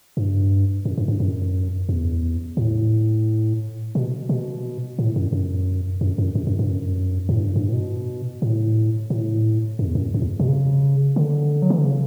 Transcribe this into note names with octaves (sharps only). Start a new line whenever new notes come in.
G2
F#2
G2
G2
F#2
E2
A2
B2
B2
A2
F#2
F#2
F#2
F#2
F#2
F#2
G2
F#2
A2
G2
G2
A2
B2
A2
A2
F#2
E2
F#2
F#2
E2
B2
C#3
D3
F#3
E3
D3
C#3